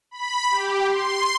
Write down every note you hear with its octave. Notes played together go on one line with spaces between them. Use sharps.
B5
G4
C6